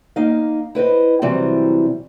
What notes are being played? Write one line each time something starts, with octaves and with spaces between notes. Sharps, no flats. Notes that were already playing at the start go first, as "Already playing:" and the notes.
A#3 D#4 F5
E4 B4 C5 D#5
C3 E3 F#3 G3 C4